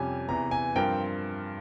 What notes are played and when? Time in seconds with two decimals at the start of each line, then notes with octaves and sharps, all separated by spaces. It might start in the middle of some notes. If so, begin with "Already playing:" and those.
Already playing: F2 C3 G3 C#4 G4 G#5
0.29 E2 C3 E3 A#5
0.51 G#5
0.76 G2 F3 C4 F4 A#4 G5